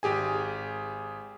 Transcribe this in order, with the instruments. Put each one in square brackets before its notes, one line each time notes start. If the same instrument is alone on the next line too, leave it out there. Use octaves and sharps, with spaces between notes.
[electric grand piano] G#1 G4 G#4 G#5